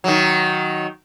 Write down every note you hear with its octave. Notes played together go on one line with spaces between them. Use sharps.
D#3 F#3